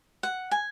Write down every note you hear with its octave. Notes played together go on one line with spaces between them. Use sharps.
F#5
G#5